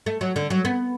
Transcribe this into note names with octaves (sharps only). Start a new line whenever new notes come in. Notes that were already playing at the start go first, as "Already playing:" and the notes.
A3
F#3
D3
F#3
B3